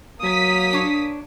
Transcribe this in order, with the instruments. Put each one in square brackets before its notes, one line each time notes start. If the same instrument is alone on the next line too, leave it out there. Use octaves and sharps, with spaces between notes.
[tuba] F#3 [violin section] A#3 D#6 B6
[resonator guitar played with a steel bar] D4 C#5